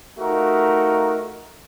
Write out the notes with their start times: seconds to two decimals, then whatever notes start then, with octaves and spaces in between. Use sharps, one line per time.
0.18 A3 D#4 F4 F#4 A#4